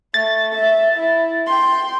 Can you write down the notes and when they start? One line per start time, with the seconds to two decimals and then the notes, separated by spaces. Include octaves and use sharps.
0.14 A3 A6
0.55 E5
0.96 E4
1.46 G5 C6